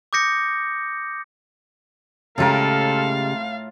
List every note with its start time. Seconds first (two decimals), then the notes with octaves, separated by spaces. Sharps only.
0.13 D6 D#6 G6 A#6 C#7
2.38 A2 C#3 G#3 F4 G4 A4 A#4 F5